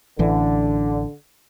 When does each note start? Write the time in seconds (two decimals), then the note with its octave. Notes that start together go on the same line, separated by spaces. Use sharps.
0.19 A1 D3 E3